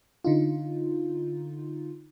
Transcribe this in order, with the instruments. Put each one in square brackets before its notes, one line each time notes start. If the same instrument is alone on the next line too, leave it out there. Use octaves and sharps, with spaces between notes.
[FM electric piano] D3 D#4 F4